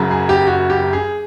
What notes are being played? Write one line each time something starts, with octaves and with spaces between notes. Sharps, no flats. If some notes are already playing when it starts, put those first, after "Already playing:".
Already playing: F#1 F#2 C#3 F#3
G#4
G4
F#4
G4
G#4